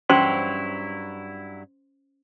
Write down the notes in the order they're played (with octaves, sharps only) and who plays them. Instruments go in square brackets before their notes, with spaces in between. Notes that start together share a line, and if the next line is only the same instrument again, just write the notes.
[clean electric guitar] G2 F#3 E4 [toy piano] C#4 C5 C6